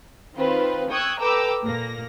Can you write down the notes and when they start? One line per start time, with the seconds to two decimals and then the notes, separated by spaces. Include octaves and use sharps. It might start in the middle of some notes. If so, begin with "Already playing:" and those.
0.37 D#3 C4 F4 B4
0.90 G5 C#6 D#6 E6 F#6 G#6
1.20 A4 B4 G5 A#5 D6 E6
1.65 A#2 A#3 A#6